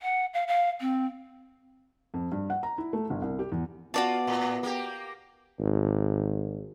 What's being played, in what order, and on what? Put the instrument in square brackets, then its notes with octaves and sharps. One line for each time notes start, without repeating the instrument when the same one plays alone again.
[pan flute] F#5
F5
F5
C4
[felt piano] F2
G2
F#5
A#5
E4
A3
G1
C2
G4
E2
[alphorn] B3 [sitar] F4 [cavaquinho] F#4 D5 A5
[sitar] A2
A#3 G4
[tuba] G#1